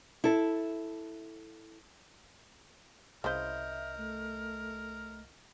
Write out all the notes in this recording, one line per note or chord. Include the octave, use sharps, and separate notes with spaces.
E4 A4
C2 C#3 E4 A#4 C5 D#5 E5 G6
A3